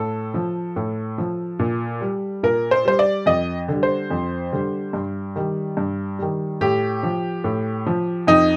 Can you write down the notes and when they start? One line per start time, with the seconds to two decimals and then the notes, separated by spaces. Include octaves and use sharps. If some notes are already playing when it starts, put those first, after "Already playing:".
Already playing: A2 A4
0.34 F3
0.76 A2
1.18 F3
1.59 A#2
2.01 G3
2.43 A#2 A#4
2.71 C5
2.85 G3 C5
2.99 D5
3.26 F2 D#5
3.68 D3 G3
3.83 C5
4.10 F2
4.52 D3 G3
4.93 G2
5.36 D#3 G3
5.77 G2
6.19 D#3 G3
6.61 A2 G4
7.03 F3
7.44 A2
7.86 F3
8.27 F2 D#4